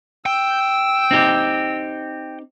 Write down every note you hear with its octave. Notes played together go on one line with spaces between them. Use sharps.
G5 E6
C4 D#4 G4